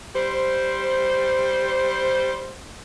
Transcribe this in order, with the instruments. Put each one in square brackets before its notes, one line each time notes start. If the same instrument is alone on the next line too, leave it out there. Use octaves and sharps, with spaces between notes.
[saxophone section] G3 C5